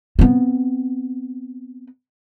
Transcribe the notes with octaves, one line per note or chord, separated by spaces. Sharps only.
B3 C4